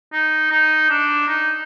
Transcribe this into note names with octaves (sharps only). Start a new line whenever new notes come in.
D#4
D#4
D4
D#4